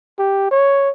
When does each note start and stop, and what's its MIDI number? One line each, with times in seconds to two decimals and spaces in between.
0.19 0.49 67
0.51 0.90 73